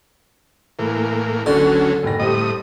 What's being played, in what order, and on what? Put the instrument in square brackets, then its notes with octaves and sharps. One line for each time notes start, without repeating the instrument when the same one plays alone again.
[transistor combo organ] A2 A#3 [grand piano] E3
[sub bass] G1 [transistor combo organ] D2 F#3 C#4 [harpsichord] D3
[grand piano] F#1 A#6 [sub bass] G#2
[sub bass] D#1 [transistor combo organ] A2 D#6 [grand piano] G3 C4 D#5